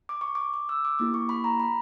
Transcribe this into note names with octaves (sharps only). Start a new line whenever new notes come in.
D6
C#6
D6
D6
E6
D6
A#3 E4 G4 D6
C#6
B5
A#5
B5